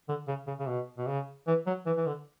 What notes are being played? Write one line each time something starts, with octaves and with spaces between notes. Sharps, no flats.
D3
C#3
C#3
C#3
B2
B2
C#3
E3
F#3
E3
E3
D3